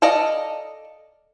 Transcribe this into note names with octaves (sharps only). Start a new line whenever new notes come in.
A4 D5 D#5 F5 A#5